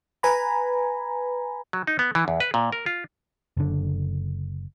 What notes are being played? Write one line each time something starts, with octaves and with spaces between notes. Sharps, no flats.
B4 G#5 A#5 B5
F#3
D#4
B3
E3
E2
B4
A#2
A#4
F4
F#1 D3